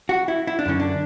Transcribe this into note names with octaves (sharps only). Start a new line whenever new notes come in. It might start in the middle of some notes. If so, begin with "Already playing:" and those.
F#4
E4
E4
D4
F#2 D3 C#4
D4